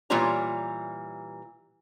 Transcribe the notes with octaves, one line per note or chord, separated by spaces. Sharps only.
A#2 E3 G3 F4 C#5 A#5